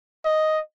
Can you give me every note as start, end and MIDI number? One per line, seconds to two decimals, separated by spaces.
0.25 0.61 75